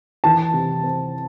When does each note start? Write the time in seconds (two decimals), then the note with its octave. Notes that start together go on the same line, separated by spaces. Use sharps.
0.24 E3 A5
0.53 C3
0.84 C4